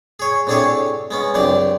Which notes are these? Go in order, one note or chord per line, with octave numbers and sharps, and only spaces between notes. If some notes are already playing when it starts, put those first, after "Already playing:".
G#4 C#5
A2 C3 D4 G#4 A4 C#5
G#3 B3 C#4
C#2 F#2 C3 D4 D5